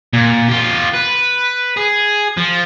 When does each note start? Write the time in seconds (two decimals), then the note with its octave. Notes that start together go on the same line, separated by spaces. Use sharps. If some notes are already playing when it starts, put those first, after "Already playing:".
0.13 A#2
0.48 F4 G4
0.94 B4
1.77 G#4
2.37 F3